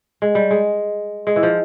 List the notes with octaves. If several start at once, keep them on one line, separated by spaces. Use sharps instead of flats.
G#3
G3
G#3
G#3
E3
F3